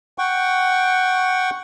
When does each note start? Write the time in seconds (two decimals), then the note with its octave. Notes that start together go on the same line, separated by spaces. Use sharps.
0.18 F#5 G5 C#6